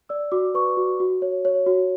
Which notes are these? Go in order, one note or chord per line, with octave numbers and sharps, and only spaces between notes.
D5 E6
F#4 D6
B4 C#6
F#4
F#4
C#5
C#5
F#4